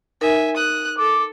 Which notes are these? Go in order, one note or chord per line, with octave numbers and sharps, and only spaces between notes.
D#4 A#4 E5 G#5
D#6 F#6
A4 D6